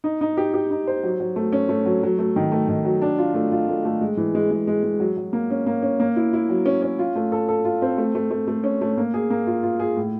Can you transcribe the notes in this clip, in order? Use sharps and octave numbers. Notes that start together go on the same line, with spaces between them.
D#4
D#4
G4
G4
D#4
C5
F#3
F#3
A3
C#4
A3
F#3
F#3
A3
D#3
A3
D#3
F#3
D4
F4
A3
F4
A3
A3
G#3
E3
G#3
G#3
G#3
G#3
F#3
F#3
A#3
C#4
A#3
C#4
A#3
E4
E4
F#3
C#4
C#4
F4
A3
A4
A4
F4
C4
A3
A3
A3
A3
C#4
A3
A#3
G#4
A#3
F4
F4
G#4
A2